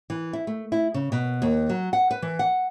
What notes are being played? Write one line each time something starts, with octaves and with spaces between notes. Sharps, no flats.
E3
E4
A3
E4
C#3
B2
D#2
F#3
F#5
B4
E3
F#5